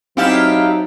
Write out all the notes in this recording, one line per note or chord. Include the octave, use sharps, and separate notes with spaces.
F#3 C4 D#4 E4 G4 F5 F#5 A5